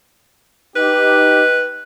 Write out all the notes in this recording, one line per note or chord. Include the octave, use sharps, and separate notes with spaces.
D#4 G4 B4